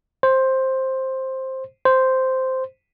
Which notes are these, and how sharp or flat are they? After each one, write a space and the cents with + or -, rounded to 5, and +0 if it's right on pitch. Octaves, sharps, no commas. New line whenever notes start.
C5 +10
C5 -5